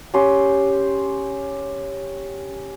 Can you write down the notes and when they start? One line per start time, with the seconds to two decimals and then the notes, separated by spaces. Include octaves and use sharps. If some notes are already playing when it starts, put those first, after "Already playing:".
0.14 C#4 G4 C6